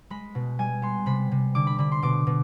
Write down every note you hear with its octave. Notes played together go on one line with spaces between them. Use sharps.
G#3 B5
B2
G3 G#5
B3 C6
C3 B5
C3
D3 D6
B5
D3 B5
C6
B2 D6
B2